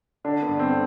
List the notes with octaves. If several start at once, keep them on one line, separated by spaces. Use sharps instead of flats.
D3 D4
B3
G2
C4
D3